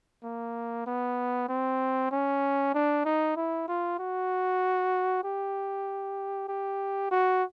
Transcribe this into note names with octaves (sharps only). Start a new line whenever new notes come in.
A#3
B3
C4
C#4
D4
D#4
E4
F4
F#4
G4
G4
F#4